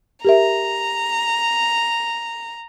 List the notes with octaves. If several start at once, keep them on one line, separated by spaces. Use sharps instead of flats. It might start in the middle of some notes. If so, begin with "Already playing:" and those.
G4 A#4 E5 A#5